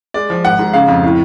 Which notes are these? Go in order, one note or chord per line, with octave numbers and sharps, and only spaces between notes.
G#3 D5
F3
G#1 F#5
G#2
C#3 F5
F2
A2